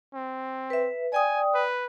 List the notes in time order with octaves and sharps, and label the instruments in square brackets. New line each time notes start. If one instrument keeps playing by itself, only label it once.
[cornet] C4
[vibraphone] B4 E5
[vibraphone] D5 G5 D#6 [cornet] G#5
[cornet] B4